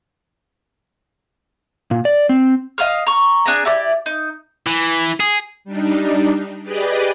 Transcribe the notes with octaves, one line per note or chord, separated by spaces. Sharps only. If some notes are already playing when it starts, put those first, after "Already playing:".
A#2
D5
C4
D#5 F5 D#6 F6
A#5 C#6
D4 G#4 A#5
E4 G4 D5
D#4
E3
G#4
G3 D4 D#4
G4 G#4 B4 D5 D#5